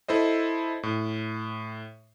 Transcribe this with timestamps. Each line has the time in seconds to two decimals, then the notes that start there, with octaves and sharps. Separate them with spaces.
0.08 E4 A4 C5 D#5
0.83 A2